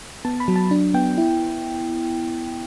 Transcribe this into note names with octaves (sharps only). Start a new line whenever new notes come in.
B3 A5
B5
F#3
A5
D4
B3 G5
E4